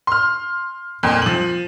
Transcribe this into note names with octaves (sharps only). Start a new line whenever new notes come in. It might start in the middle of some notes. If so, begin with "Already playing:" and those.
C6 F6
F2 A#2
F3 F#7